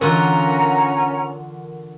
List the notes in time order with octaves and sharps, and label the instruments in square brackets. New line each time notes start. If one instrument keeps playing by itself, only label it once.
[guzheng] D3 F4 F#4 [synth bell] E3 A#4 [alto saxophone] C#4 [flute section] F#5 A#5